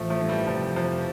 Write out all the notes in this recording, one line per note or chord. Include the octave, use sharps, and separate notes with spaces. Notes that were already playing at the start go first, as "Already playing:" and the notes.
Already playing: A1 F3 A3
F3 A3
G2
E3 G3
F1 F3
F2 F3